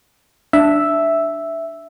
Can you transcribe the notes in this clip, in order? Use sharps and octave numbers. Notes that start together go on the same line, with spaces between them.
D4 E5